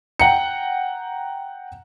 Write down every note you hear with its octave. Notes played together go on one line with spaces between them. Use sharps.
F#5 G5 A#5 C#7